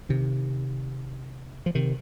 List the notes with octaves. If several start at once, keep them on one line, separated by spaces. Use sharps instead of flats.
C3 D#3
F3
C3 D#3